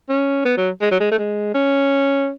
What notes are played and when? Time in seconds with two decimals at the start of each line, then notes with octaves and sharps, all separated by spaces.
0.09 C#4
0.45 B3
0.57 F#3
0.81 G#3
0.91 F#3
1.00 G#3
1.11 A3
1.18 G#3
1.54 C#4